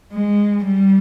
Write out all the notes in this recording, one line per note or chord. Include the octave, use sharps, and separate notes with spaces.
G#3
G3